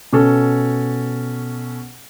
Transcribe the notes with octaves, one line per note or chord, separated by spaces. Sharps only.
B2 C#4 A4